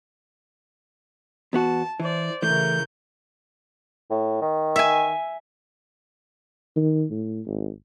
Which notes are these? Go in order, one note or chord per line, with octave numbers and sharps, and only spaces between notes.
E2 B3 F#4 A5
E3 C5 D5
C#3 E3 A3 A#4 G6
A2
D#3
E5 G#5
D#3
A2
G#1